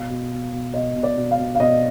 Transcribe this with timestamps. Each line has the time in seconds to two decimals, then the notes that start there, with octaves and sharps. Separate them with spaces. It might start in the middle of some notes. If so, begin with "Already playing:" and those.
Already playing: B2 F5
0.10 B2
0.32 B2
0.52 B2
0.74 B2 D#5
0.95 B2
1.03 D5
1.17 B2
1.31 F5
1.38 B2
1.55 F5
1.60 B2 D#5